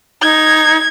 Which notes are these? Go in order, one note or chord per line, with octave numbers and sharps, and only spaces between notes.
D#4 G#6